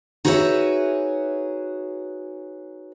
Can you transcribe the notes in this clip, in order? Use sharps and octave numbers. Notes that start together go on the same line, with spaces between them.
D#4 F#4 G#4 B4 C#5 E5